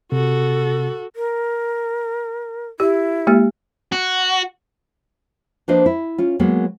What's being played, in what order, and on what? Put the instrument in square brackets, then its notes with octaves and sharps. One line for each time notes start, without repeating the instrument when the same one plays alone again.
[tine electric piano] C3 [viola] F#4 A4
[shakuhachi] A#4
[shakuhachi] E4 [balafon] G4
[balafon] G#3 A#3 G4
[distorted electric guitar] F#4
[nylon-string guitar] F3 A#3 D4 B4 C5 D#5
E4
C#4 F4
F#3 G#3 A#3 B3